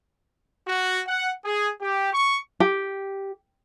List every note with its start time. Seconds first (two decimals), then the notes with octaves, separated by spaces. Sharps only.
0.68 F#4
1.07 F#5
1.44 G#4
1.82 G4
2.14 C#6
2.60 G4